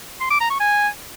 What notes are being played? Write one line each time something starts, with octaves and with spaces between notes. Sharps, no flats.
C6
D6
A#5
C#6
G#5